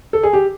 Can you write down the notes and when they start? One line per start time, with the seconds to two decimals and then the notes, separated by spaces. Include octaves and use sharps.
0.13 A4
0.23 G#4
0.33 G4